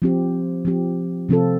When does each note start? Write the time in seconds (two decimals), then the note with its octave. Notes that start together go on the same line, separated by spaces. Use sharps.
0.02 F3 C4 G4
0.65 F3 C4 G4
1.29 C3 F3 C4 F4 A4